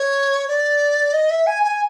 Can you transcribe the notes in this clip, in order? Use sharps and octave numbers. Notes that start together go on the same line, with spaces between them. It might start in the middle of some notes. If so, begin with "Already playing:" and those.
Already playing: C#5
D5
D#5
E5
G#5
G#5